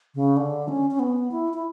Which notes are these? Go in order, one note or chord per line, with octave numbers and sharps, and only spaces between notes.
C#3
D3
C#4
C#4
B3
E4
E4